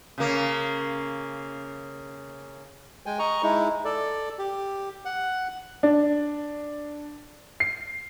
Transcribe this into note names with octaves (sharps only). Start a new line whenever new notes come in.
C#3 A#3
G#3 G5 G#5
D#5 A#5 C#6
G#3 D#4 E4
A4 D5
G4
F#5
D4
C7